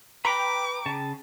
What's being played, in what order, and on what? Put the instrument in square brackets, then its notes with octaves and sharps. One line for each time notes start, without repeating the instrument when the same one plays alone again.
[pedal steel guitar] B4 B5 [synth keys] G5 A#5 [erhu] D6
[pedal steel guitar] C#3 A5